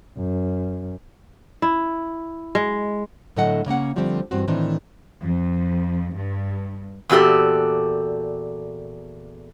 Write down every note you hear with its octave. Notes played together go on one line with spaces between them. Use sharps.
F#2
E4
G#3
A2 D3 F#3 A4 D#5 F#5
C#3 A#3 C#4 F#5
D3 F3 G3 A3 C4
G2 E3 C4 F#4
A2 D#3 E3 C4 D4
F2
G2
E2 A#2 F#4 G4 A4